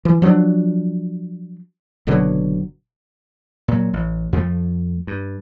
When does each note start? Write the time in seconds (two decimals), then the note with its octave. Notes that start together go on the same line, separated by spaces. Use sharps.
0.05 E3
0.22 F3 F#3 A#3 D4
2.07 F#1 B2 D3 F#3
3.68 A#2 F#3
3.93 A1
4.33 F2 F3 G#3 A3
5.07 G2